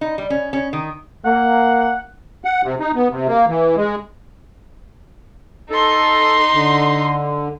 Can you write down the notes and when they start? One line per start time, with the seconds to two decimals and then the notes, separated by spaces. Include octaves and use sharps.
0.01 D#4
0.18 G3
0.30 C#4
0.53 C#4
0.73 D#3
1.25 A#3 F#5
2.45 F#5
2.64 C3
2.80 D#4
2.95 B3
3.11 C3
3.28 A#3
3.48 E3
3.77 G#3
5.70 D#4 A4 C6
6.53 D3